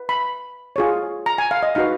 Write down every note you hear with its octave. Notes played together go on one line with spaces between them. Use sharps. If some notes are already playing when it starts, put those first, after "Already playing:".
Already playing: B4
B5
F4 G#4 C#5
A#5
G#5
F5
D#5
D#4 F#4 B4 F5